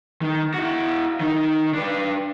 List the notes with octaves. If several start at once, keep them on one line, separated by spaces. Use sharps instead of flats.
D#3
E4 F#4
D#3 D#4
D4 B4